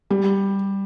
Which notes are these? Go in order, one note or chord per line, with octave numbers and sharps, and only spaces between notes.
G3